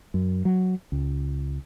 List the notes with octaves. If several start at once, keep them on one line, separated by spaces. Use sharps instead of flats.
F#2
F#3
C#2